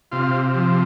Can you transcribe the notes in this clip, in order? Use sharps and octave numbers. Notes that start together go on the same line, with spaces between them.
C3 F4
F3